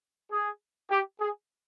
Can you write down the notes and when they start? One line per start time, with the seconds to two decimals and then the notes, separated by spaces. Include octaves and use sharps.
0.31 G#4
0.90 G4
1.20 G#4